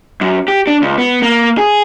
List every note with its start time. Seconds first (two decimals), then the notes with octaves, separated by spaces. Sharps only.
0.21 F#2
0.48 G4
0.67 D4
0.82 C#2
0.98 B3
1.22 A#3
1.58 G#4